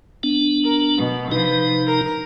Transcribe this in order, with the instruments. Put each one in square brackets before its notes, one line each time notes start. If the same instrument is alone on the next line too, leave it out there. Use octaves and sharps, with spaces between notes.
[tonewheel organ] B3 D4
[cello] A#4
B2
[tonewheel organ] C3 D#4 [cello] F3 B4
[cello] A#4